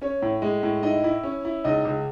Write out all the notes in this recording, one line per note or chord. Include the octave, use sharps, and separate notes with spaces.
C#4 C#5
A2
G#3
A2
D#4 E4 D#5
E4
C#4
E4
C#2 D#4 D#5
C#2